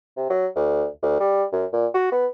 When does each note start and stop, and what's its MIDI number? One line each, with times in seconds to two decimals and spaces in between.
0.17 0.29 48
0.30 0.47 54
0.56 0.86 38
1.02 1.19 38
1.20 1.44 55
1.53 1.65 42
1.73 1.87 46
1.94 2.07 66
2.12 2.26 59